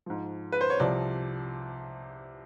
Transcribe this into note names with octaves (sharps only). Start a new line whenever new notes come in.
G#2 F3
B4
C5
C#5
C2 C3 F3 D5